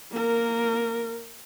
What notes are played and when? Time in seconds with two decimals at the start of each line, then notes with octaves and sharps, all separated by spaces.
0.11 A#3 A#4